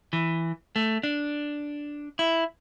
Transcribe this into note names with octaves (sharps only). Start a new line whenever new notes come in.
E3
A3
D4
E4